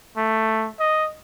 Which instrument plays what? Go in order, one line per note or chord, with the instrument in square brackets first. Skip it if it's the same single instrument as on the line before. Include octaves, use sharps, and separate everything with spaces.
[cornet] A3
D#5